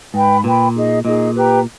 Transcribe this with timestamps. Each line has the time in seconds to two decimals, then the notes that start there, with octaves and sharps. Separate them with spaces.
0.14 G#2 B4 G5 B5
0.43 A#2 B4 G5 B5
0.74 D#4 G#4 D#5
1.05 A#2 D#4 G#4 D#5
1.35 G4 B4 G5 A#5